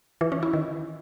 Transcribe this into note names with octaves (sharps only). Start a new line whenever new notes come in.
E3
C#4
E4
D#3